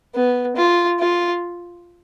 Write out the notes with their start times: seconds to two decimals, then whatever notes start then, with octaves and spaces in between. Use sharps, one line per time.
0.15 B3
0.56 F4
1.00 F4